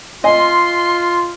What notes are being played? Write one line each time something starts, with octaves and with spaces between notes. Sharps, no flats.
F4 D#5 G#5 C6